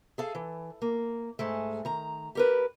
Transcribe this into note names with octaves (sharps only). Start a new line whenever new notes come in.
G#4 A4 F5
E3
A#3
G#2 G#3 A3
D#3 A#5
G4 A#4 B4